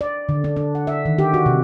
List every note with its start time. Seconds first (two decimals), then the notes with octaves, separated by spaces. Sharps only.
0.01 D5
0.29 D3
0.44 D4
0.56 D4
0.75 F#5
0.87 E5
1.06 D#3
1.19 G4
1.34 F#4
1.46 C3